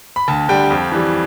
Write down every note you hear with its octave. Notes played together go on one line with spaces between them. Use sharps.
B5
D2 A5
D3 G3 G5
F2
E3 G3